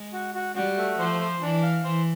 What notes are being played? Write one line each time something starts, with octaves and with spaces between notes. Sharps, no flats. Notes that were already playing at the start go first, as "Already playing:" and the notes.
Already playing: G#3
F#4
F#4
G3 F#4
A3
F3 C5
C5
E3 D4
F5
E3 C5